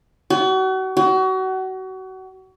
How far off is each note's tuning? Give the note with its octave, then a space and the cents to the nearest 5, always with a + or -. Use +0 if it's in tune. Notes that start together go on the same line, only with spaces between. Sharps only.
F#4 +35
F#4 +30